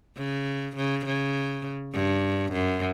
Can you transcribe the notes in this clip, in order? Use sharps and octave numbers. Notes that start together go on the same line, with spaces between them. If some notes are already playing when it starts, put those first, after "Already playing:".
C#3
C#3
C#3
G2
F#2